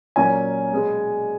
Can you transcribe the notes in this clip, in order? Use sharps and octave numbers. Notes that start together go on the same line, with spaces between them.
A#2 F#3 A#3 C#4 G#5
B2 G#3 B3